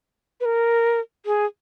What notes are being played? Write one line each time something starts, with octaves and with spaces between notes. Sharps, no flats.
B4
A#4
G#4